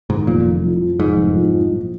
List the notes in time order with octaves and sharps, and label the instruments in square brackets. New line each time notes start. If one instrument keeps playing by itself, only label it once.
[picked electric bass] G#2 [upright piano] D#3
[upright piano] F1 [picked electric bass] A#2
[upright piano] F1
F2
F3
[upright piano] F1 [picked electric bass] G#2
[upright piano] F1
F2
F3
A#1